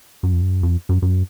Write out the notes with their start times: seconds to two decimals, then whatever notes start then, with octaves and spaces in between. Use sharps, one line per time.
0.23 F#2
0.32 F2
0.41 F#2
0.63 F2
0.89 F#2
1.02 F#2